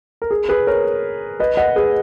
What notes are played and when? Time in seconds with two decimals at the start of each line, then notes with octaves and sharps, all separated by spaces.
0.22 A#4
0.31 G#4
0.49 G#4 B4
0.67 A#4 C#5
1.40 B4 D#5
1.57 D#5 F#5
1.76 G#4 B4